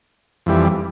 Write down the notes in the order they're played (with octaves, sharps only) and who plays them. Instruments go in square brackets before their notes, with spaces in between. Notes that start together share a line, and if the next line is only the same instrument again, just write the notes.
[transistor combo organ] F2 E3 G3